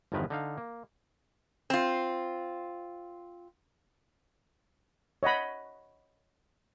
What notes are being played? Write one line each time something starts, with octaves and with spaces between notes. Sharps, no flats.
G1 E2 D#3 F3 A#4 B4
D3 D#4 F5
A#3
C4 F4
C#5 D#5 F#5 B5